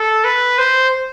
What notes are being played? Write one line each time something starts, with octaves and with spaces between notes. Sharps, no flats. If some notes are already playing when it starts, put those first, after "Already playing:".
Already playing: A4
B4
C5